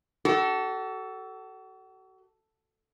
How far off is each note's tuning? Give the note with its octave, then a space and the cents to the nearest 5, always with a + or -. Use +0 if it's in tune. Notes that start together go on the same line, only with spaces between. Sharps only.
F#4 +40 A4 +0